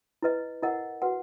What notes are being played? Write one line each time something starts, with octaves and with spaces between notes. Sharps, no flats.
E4 B4 D#5
E4 A#4 D#5 F#5
F#4 B4 F#5